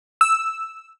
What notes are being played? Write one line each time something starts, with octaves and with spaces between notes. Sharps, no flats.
E6